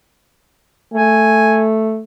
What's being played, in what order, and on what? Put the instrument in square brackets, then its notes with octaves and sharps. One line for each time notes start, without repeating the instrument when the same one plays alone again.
[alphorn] A3 [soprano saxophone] G#5